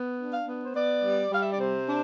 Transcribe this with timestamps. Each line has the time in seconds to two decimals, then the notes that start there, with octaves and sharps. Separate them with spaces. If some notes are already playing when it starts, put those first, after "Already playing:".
Already playing: B3
0.18 D4
0.32 F5
0.46 B3
0.64 C5
0.74 B3 D5
1.03 G3
1.30 G3 F5
1.42 E5
1.51 D5
1.60 C3 C5
1.88 D4